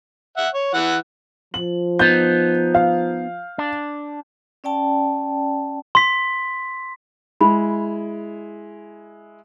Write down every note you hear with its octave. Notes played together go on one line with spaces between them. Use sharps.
E5 F#5
C#5
E3 F#5
F3 F#7
B3 D#4 G6
F5
D4
C#4 D5 G5 A5
C6 B6
G#3 E4 B5